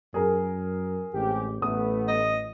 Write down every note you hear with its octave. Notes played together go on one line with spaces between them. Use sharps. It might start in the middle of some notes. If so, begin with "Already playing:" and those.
F#2 G#4 A#4
A1 G#3 C4 G4
A1 A3 B3 D#6
D#5